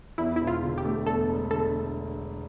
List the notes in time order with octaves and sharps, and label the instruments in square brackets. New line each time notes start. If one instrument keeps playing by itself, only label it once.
[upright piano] E2 [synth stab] E4
[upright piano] E1 [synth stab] E4
[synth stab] F4
[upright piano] D3
[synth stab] G4
[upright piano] A3
[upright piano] E2 [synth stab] A4
[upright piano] E1
[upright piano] D3 [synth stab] A4
[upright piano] A3